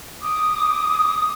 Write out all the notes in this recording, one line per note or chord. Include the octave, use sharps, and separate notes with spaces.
D6 D#6